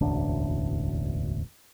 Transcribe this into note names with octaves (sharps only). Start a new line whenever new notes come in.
E1 A1 D2 D4